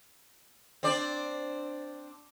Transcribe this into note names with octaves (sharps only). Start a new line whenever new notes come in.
C4 D4 D5